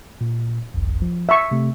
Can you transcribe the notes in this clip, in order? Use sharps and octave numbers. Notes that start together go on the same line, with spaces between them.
A#2
G1 C2 F2
F3
E5 C#6 E6
C3 A3